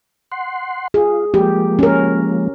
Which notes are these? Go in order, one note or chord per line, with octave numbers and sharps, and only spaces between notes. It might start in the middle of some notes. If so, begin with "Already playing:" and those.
F#5 C6
F4 G#4
F3 G#3 A#3 G4
C#4 A#4